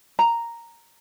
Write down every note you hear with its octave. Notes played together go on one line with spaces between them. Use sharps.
A#5